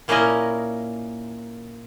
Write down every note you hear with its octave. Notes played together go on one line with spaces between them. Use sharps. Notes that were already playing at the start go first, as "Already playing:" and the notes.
A#2 A#3 C#4 E4 A#4 D#5